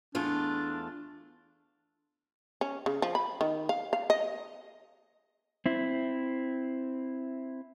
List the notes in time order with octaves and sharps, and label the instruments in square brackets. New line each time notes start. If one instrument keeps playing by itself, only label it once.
[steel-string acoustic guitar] E2 A3 F4 [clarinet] D4
[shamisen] C#4
C#3
F3
B5
D#3
F5
F5
D#5
[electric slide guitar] C4 E4